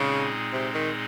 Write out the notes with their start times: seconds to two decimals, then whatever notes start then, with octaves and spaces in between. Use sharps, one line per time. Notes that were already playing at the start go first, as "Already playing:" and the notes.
Already playing: A#2 C#3 G#3 C4 D#4 G#4
0.53 C3
0.74 D#3